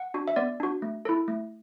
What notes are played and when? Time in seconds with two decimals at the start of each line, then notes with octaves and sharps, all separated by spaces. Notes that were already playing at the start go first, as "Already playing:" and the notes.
Already playing: F#5
0.14 D4 F#4
0.28 E5
0.36 B3 D5
0.60 D4 F#4
0.82 A3
1.05 E4 A4
1.28 A3